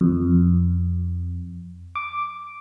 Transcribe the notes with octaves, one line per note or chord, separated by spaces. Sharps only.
F2
D6